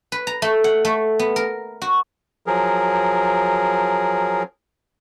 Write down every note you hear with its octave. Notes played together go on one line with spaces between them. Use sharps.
B4
A#5
A3
F#5
A3
B3
A#4
F#4
F3 F#3 G#4 A#4